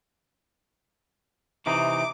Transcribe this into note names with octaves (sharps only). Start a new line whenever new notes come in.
C3 E3 D#4 D6